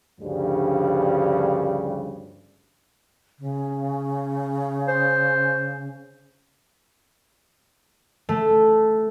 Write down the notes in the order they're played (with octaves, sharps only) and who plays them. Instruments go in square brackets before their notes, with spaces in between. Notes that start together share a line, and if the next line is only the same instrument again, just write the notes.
[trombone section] D2 G2 C#3 F3 G3
[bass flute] C#3
[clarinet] C5
[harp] A3